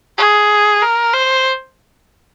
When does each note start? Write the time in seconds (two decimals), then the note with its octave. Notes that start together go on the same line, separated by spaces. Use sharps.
0.18 G#4
0.82 A#4
1.13 C5